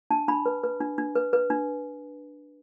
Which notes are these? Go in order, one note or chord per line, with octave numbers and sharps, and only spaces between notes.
D4 A5
D4 B5
B4
B4
D4
D4
B4
B4
D4